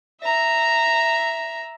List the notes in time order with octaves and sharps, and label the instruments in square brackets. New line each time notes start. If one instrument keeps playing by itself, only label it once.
[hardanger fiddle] E5 A#5